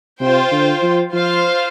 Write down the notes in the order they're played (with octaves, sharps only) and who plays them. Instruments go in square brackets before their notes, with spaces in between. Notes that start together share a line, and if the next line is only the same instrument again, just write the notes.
[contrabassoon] C3 [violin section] F4 C5 G5
[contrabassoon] D3
F3
[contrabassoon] F3 [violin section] F4 C5 F5